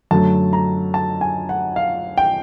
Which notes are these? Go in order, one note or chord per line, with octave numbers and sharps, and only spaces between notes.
F#2 D3 F#3 A3 A5
A#5
A5
G#5
F#5
F5
G5